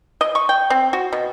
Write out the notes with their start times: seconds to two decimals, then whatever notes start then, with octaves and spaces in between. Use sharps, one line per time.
0.21 D#5
0.35 C#6
0.49 G5
0.70 C4
0.93 F#4
1.12 B2